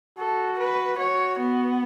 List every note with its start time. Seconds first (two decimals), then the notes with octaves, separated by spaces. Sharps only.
0.18 F#4 A4
0.59 B4
0.98 F#4 C#5
1.38 B3